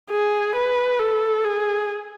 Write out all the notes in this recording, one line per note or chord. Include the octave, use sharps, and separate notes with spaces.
G#4
B4
A4
G#4